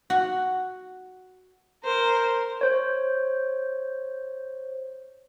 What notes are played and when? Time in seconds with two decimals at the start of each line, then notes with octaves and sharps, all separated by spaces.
0.10 F#4
1.85 A#4 C5
2.61 C5 C#5